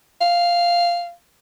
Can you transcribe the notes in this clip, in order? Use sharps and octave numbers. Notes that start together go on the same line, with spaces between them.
F5